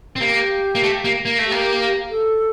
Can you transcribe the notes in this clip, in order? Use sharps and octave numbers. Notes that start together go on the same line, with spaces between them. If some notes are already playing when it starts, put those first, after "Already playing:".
C4
A#3 G4
A#3
A3
A#3
A#3
A3
G4
A#3
A4